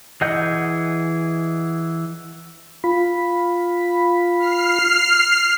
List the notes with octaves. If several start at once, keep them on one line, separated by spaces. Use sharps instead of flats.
E3 G#4 D#5 F#5 G6
F4 B5
F6 C7